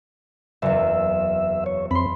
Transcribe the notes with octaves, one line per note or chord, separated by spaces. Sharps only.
F#1 E2 E5
C#5
F2 C4 B5 C6